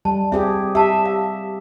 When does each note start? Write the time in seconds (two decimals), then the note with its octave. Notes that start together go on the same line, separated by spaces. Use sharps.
0.05 G3 A5
0.32 C4 G4 G#4 E5
0.75 G4 E5 A5
1.06 F5